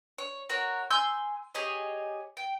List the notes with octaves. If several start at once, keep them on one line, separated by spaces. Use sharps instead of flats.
C#5
F#4 A#4 C#5
G#5 C6 E6 G6
G4 G#4 C#5 D#5
G5